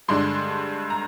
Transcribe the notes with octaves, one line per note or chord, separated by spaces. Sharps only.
G2 D3 G#3 D4 C6
A#5